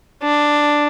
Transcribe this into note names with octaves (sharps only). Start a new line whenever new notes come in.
D4